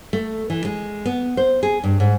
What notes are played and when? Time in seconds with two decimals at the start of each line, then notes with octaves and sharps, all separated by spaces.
0.13 A3
0.50 E3
0.65 G#3
1.06 B3
1.37 C5
1.63 G#4
1.84 G2
2.00 G#2